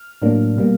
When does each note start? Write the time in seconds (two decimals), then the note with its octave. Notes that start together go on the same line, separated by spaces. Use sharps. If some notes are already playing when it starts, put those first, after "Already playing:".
Already playing: F6
0.22 A2 F#3 A#3 D4
0.57 B2 G3 A#3